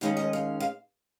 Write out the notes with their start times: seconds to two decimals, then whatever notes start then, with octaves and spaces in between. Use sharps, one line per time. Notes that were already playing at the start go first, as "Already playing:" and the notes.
0.01 D#2 D#3 G#3 C#4 F5
0.17 D#5
0.33 F5
0.60 F5